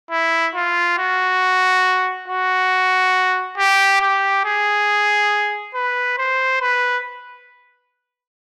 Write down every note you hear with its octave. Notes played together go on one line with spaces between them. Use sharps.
E4
F4
F#4
F#4
G4
G4
G#4
B4
C5
B4